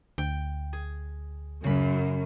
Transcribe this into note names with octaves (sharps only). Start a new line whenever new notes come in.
D2 G5
G#4
F#2 C#3 B5